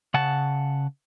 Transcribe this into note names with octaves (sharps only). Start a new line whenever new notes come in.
C#3 F#5 A5